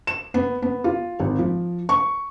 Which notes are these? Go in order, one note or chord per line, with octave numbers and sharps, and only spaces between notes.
E7
B3
B3
F4
G#1
F3
C#6